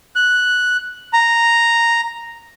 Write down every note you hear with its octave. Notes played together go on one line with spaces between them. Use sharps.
F#6
A#5